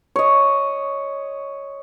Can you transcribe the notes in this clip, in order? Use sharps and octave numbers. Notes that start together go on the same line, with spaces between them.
C#5 D#5